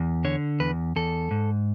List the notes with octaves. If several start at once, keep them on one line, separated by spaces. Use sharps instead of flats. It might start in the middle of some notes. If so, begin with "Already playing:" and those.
Already playing: E2
D3 C#5
E2 B4
E2 A4
G#2